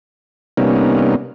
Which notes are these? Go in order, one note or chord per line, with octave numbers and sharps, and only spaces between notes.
C3 G3 A#3 B3 C#4 D#4